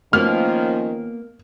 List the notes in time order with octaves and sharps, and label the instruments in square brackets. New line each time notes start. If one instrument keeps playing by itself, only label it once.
[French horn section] D#3 F3 C#4 [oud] A#3 B3 [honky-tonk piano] F6